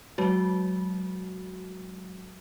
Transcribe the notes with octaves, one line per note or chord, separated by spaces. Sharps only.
F#3 G#3 F#4